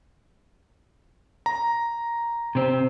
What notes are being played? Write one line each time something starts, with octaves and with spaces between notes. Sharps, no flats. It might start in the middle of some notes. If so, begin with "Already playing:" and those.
A#5
C3 C4